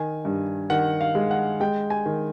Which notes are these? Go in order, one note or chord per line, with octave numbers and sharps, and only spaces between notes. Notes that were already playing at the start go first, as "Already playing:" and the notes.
Already playing: D#3 G#5
G2
D#3 F#5
F5
G#3
F#5
G#3 G5
G#5
D#3